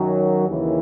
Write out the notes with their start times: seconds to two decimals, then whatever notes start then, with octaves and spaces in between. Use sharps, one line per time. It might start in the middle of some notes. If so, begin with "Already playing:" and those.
Already playing: F#2 D#3 F#3
0.46 D#2 C#3 E3